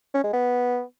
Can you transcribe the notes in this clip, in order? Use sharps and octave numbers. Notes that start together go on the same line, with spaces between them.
C#4
G#3
B3